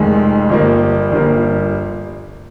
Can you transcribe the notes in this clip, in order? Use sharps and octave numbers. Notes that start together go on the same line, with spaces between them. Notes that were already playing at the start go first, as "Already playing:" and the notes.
Already playing: F1 F2 D#3 G#3
G1 G2 F3 A#3
G1 G2 F3 A#3